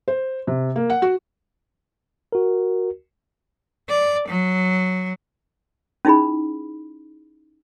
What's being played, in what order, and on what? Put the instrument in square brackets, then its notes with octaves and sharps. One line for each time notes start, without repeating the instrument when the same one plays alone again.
[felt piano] C5
C3
A#3
F#5
F#4
[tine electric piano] F#4 A#4
[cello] D5
F#3
[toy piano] C#4 D#4 E4 G#4 B5